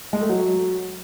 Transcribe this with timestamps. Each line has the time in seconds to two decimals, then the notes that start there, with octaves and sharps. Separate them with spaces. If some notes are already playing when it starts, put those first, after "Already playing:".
0.13 G#3
0.21 A3
0.29 F#3